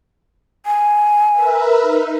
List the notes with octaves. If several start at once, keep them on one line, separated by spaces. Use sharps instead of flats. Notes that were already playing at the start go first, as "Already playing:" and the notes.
G#5
A#4 B4 E5
D#4